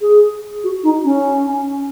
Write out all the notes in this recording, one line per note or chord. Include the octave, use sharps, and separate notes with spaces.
G#4
F#4
D#4
C#4